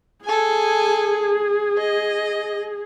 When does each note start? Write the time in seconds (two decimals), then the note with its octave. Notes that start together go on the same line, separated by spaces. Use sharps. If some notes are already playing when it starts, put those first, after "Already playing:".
0.25 G#4 A4 G#5
1.77 D#5